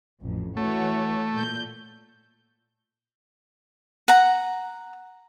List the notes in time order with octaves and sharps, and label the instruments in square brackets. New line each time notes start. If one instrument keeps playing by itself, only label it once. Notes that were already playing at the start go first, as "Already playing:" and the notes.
[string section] A1 F2
[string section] E3 F#4 C#5 [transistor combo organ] A3
[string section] A#2 G6
[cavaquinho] F#5 A#5